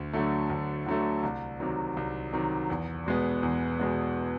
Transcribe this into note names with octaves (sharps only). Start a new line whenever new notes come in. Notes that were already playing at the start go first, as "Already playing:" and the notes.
Already playing: D2
D3 F#3 A3
D2
D3 F#3 A3
C2
C3 D#3 F#3
C2
C3 D#3 F#3
E2
B2 G#3 B3
E2
B2 G#3 B3